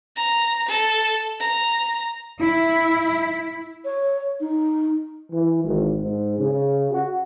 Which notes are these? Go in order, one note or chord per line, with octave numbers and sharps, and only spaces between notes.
A#5
A4
A#5
E4
C#5
D#4
E3
G#1
G#2
C#3
F#4